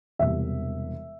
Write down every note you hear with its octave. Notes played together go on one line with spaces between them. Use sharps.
E1 E2 C3 G3 E5